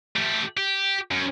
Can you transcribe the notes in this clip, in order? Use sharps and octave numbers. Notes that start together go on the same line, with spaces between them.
A3 G4
G4
F#2